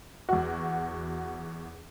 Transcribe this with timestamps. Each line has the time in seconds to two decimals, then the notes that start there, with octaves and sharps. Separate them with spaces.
0.29 E2 F#4